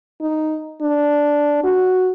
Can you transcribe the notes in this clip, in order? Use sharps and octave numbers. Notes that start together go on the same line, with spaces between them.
D#4
D4
F#4